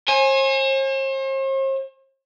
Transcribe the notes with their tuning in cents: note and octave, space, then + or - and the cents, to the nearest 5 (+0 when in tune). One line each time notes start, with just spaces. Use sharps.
C5 +45 G#5 +0